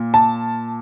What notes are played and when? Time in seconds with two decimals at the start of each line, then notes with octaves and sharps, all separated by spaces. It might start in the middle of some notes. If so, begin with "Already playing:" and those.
Already playing: A#2
0.14 A5